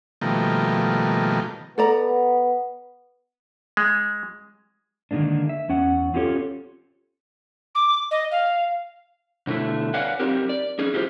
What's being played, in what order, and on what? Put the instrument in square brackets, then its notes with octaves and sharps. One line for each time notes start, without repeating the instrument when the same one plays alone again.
[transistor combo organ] B2 D#3 F3 G3 A3 A#3
[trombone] B3 [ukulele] A4 D5 A#5
[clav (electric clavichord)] G#3
[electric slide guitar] D3 D#3 G#3 A#3 D4
E5
E2 C#4 F#5
C4 C#4 F4 G4 A4 C#5
[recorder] D6
D#5
F5
[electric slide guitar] B2 D3 A3 E4
B4 C#5 D5 F5 F#5 G#5
C4 D#4 G4 A#4
D5
C#4 D#4 G#4
E4 F4 G4 A#4 C5